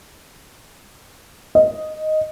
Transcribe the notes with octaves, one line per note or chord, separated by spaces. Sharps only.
D#5